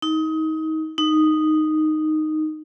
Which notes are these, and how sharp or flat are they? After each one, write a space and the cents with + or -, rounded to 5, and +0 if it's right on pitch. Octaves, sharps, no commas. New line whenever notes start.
D#4 +25
D#4 -5